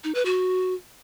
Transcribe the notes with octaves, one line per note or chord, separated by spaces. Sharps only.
D#4
B4
F#4